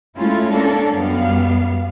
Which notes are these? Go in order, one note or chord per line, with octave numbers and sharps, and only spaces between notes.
G#3 A3 C#4 E4 F4
A#3 C#4 D4 A4
F#2 G3 B3 F5